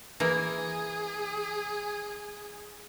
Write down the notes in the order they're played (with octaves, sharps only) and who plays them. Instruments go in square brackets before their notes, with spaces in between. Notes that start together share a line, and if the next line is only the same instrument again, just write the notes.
[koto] E3 A#3 [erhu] G#4